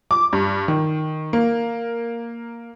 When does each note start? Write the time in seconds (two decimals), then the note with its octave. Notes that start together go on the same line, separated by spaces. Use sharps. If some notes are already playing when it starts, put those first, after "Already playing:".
0.11 D6
0.33 G2
0.68 D#3
1.33 A#3